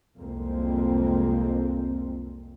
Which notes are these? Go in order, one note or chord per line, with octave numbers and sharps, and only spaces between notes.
C2 F2 G#3 A#3 C4